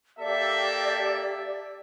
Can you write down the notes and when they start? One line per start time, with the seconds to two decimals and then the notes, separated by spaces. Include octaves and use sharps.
0.19 A#3 G4 A4 D5 E5